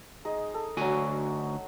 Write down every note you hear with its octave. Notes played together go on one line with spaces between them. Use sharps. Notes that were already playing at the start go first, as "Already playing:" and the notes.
G#3 D#4 D#5
A4
D2 F#3 F#4 G#5 C#6